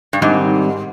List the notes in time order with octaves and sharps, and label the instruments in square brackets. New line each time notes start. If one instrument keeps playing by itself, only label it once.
[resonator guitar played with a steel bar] G2
[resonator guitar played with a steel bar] G#2 [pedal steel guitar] D#3 G3 C4